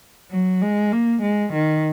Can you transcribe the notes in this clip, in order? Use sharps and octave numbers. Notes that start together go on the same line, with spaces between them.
F#3
G#3
A#3
G#3
D#3